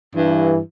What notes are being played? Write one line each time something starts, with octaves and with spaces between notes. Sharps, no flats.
G2 E3